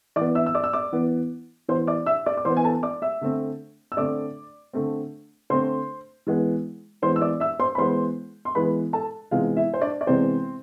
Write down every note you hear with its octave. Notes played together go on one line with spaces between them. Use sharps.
E3 B3 D5 D6
E5 E6
E6
D5 D6
E6
D5 D6
E3 B3
E3 B3 C5 C6
D5 D6
E5 E6
D5 D6
D6
E3 B3 C5 C6
G#5
A4 A5
D5 D6
E5 E6
D3 A3 C4
E6
D3 A3 C4 D5 D6
D3 A3 C4
D3 A3 C4 C5 C6
E3 G#3 B3
E3 G#3 B3 C5 C6
E6
D5 D6
E5 E6
C5 C6
B5
E3 G#3 B3 C5 C6
C6
E3 G#3 B3 B4 B5
A4 A5
C3 E3 G#3 B3 F4 F5
E4 E5
C5
D4 D5
D5
C3 E3 G#3 B3 C4 C5